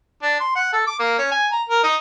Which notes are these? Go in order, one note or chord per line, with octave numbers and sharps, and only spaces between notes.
D4
C6
F#5
A4
D6
A#3
C#4
G#5
A#5
A#4
D#4